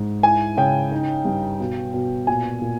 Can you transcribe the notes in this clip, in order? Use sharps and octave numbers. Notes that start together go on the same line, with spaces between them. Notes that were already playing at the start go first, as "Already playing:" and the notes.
Already playing: G#2
E4 G#5
C#3 G5
D#4
G2
B2
B2
A#2 G#5
A#2